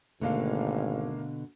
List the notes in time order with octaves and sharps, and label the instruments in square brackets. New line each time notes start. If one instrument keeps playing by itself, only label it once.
[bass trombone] G#1 [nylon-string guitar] B2 D3 [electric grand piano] A3 A#3 F5